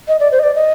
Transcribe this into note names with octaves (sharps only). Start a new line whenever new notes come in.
D#5
D5
C5
D#5
D5
D#5